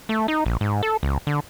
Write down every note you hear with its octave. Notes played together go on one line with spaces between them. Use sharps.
A3
D#4
A#1
G#2
A4
C#2
D3